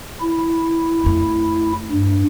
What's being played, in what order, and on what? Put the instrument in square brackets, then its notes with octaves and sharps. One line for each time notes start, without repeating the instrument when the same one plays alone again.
[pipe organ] E4
[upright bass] F2 A3
[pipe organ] G2